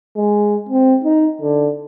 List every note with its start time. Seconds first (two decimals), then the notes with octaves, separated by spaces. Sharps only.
0.16 G#3
0.69 C4
1.04 D#4
1.42 D3